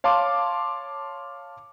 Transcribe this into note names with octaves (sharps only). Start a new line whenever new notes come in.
C#5 F5 A5 C6 D6